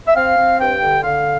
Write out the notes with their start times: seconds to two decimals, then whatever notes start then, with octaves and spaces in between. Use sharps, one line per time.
0.07 E5
0.15 C4 F5
0.37 C4
0.59 G2 G5
0.82 D3
1.04 D3 F5